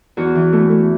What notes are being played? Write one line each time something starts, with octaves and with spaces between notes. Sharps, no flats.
E2 F#4
E3
A3
A3